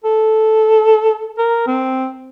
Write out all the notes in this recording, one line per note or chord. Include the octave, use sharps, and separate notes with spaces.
A4
A#4
C4